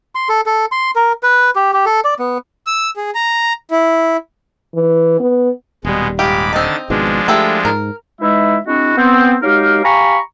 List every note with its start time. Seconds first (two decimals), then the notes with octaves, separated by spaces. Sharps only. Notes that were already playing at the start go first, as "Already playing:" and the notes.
0.15 C6
0.29 A4
0.46 A4
0.72 C6
0.96 A#4
1.23 B4
1.56 G4
1.74 G4
1.86 A4
2.04 D5
2.19 B3
2.67 E6
2.97 G#4
3.15 A#5
3.71 E4
4.75 E3
5.20 B3
5.85 D#1 B2 G3 G#3
6.19 G#2 F4 G4 B5 D6
6.53 D3 D#3 C4 D#4 A6
6.90 G#1 G#2 B2 F3 G#3 D4
7.28 A3 E4 G4 A4
7.65 G#2 A#4
8.21 E3 G#3 D#4 E4 E5
8.67 G#3 C4 D4 E4 F#4
8.98 B3 C4
9.43 F#3 G#3 D#4 G4 A#4 F5
9.84 G4 F5 G#5 A#5 B5 C#6